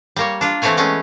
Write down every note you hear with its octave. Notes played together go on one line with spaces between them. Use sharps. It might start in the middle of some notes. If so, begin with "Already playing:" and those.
G3 A#3 C#5
D4 F4
E3 A3 C4 E4 C#5 G#5
G#3 A3 B3 C#4